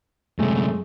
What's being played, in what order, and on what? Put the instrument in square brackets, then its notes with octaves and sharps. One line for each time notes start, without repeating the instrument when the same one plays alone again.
[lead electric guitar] F#2 C3 [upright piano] G#3 A3